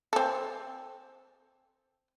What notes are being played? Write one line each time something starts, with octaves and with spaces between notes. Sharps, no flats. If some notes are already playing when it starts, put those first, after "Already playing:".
C4 A4